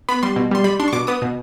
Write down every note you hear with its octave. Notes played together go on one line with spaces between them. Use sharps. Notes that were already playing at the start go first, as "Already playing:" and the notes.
B3 B5
G3 C6
B2
G3 C6
G3 B5
D4 C6
C#6
B2 D6
B3 D#6
B2